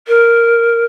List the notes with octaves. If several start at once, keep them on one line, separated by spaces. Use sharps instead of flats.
A#4